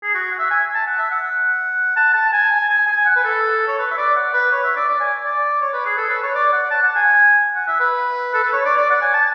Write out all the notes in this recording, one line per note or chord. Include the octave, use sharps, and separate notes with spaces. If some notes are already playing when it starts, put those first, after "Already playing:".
G#4
F#4
F#5
E5
G#5
A5
F#5
E5
F#5
A5
A5
G#5
G#5
G#5
G#5
F#5
B4
A4
C#5
B4
E5
D5
F#5
B4
C#5
E5
D5
D5
G#5
D5
C#5
B4
G#4
A4
B4
C#5
D5
F#5
A5
F#5
G#5
F#5
E5
B4
A4
B4
C#5
D5
D5
F#5
G#5
A5